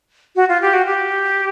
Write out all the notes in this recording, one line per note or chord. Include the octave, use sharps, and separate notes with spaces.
F#4
F4
G4
F#4
G4